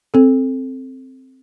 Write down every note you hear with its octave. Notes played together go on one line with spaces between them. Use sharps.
C4 A4